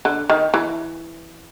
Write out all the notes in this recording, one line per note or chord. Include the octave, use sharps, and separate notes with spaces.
D3
D#3
E3